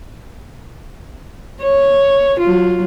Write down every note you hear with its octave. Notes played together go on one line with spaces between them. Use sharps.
C#5
F#3 F4